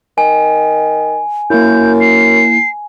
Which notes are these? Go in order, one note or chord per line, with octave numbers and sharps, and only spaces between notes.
D#3 G#5
F#2 A#3 E4 G6
C7